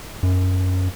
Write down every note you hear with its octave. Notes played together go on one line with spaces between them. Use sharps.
F#2